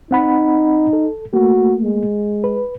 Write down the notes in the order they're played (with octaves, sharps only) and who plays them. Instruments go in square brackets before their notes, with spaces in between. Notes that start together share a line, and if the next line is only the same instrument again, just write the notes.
[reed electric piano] C4 F#5 B5 [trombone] D#4
[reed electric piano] A4
[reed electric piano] A3 A#3 [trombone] F#4
[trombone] G#3
[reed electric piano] B4